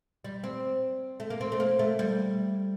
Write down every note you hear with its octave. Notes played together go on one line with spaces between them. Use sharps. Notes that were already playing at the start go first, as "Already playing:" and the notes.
G3
C4
A3
A#3
C4
A3
A#3
A3
G3